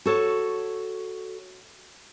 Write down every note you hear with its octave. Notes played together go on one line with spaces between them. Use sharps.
F#4 A4 C#5